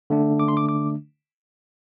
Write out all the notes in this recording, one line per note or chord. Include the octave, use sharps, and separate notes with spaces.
D3 A3 D4
D6
C6
D6
D6